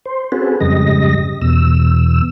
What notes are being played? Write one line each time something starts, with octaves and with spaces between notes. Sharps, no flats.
C5
C4 C#4 F#4 G#4 A4 B4
F2 G#2 C#3 G3 D#5 A#6
E2 B2 E6